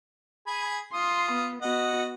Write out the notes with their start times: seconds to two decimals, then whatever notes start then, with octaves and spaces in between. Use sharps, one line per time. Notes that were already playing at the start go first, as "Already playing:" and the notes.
0.47 G#4 G#5 B5
0.94 F4 C6 D#6
1.32 B3
1.62 B3 F#4 D#5 F#5